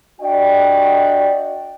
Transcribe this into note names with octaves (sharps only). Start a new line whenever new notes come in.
D4 F#4 D5 D#5 G5